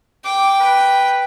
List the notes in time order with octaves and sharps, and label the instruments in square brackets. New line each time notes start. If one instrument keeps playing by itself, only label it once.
[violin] G5 [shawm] D6
[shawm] B4